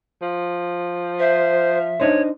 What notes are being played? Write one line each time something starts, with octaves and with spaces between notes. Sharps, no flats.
F3
C5 E5
D4 D#4 C5 C#5